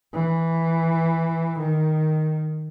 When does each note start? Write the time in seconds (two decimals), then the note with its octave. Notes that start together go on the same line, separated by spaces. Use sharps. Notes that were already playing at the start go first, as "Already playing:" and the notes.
0.13 E3
1.58 D#3